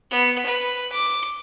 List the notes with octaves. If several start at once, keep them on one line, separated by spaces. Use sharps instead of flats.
B3
B4
D6